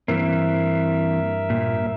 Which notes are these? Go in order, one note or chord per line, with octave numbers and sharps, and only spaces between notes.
G2 E3 A#3 C4 A#4 E5
A#2